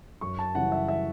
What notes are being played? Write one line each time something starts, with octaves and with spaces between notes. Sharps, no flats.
F#2 C#6
A5
C#3 E3 G3 F#5
E5
E5